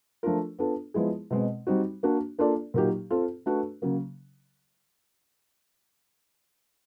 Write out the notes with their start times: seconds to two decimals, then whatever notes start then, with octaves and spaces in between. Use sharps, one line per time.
0.23 F3 A3 D4 F4 A#4
0.59 B3 D4 F4 A4
0.94 F3 G#3 B3 E4 G#4
1.30 B2 G#3 C4
1.67 G3 C4 D#4 F#4
2.03 A#3 D4 F#4
2.39 A#3 D4 F4 A4 D5
2.74 A#2 F#3 A#3 D#4 G4
3.10 C4 F4 A4
3.46 A3 D4 F#4 B4
3.82 C#3 F#3 A#3